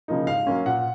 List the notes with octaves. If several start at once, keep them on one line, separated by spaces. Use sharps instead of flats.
C#3 F3 A#3 D#4
G#2 F5
F#3 A#3 C#4
A#2 F#5